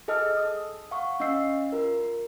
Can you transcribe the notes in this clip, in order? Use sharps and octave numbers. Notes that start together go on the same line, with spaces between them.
G#4 A4 D#5 A5 E6 F6
D#6
F5 F#5 C#6
C#4 D#5 F5 E6 C7
F4 A#4